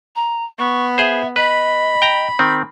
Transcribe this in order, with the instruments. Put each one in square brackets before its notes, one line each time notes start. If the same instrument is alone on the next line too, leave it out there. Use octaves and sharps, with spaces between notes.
[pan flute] A#5
[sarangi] B3 [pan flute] C#6
[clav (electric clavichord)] G#4 C5 [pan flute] E5
[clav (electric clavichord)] B4 [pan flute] D#5 [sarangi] B5
[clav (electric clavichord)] G5 A#5
D#3 C4